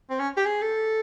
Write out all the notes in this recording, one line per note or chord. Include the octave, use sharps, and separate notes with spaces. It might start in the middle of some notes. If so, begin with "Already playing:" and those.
C4
C#4
G4
G#4
A4